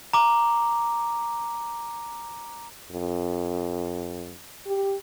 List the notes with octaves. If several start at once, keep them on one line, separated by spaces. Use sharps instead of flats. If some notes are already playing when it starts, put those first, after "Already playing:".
A#5 D6
F2
G4